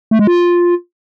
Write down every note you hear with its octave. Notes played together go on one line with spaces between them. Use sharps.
A3
G#3
F4